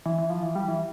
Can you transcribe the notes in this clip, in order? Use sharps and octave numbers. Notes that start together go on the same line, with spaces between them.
E3
E3
F3
E3
G3
E3